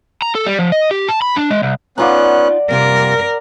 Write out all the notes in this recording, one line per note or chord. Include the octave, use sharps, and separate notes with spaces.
A#5
A4
G3
F3
D#5
G4
A5
B5
D4
G#3
C2
B3 C#4 D#4 F4 D5 F#5 A#5 F#6
C3 G3 A#3 F4 A#4